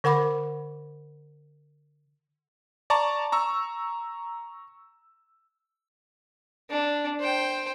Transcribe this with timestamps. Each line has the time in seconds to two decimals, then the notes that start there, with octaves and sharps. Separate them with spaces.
0.04 D3 A#4 F#5 B5 D6
2.90 D5 A5 A#5 C#6
3.32 A#5 C#6 E6
6.71 D4
7.21 C5 G5